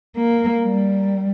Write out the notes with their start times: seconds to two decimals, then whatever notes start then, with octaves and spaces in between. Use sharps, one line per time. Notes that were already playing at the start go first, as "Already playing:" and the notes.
0.17 A#3
0.62 G3